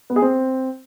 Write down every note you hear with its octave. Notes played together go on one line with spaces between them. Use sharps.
B3
G#4
C4